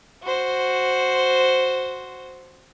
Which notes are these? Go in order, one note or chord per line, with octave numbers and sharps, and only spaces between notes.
F#4 C5